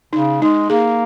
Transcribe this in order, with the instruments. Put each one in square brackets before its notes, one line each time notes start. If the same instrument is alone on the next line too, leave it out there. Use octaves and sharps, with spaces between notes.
[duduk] C#3 [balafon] D#4
[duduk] G#3 [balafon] D#4
[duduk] A#3 [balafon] G#4